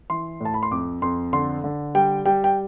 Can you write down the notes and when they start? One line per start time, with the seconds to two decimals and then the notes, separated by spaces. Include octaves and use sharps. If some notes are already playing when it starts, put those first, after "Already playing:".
0.10 E3 C6
0.40 A2 A5
0.54 B5
0.63 C6
0.71 F2 D6
1.02 F2 C6
1.33 D3 C6
1.64 D3
1.95 G3 G5
2.25 G3 G5
2.44 G5